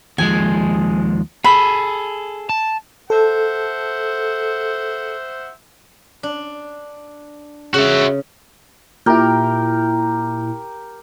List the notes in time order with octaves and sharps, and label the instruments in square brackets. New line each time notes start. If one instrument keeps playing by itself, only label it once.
[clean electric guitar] D#2 F3 G#3 [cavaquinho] G#5
[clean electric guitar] G#4 A4 [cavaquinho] B5
[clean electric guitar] A5
[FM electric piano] A4 [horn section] C5 E5 F#5
[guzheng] D4
[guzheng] C#3 [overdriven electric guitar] F#4 E5
[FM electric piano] A#2 E4 [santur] G4 A#4 G5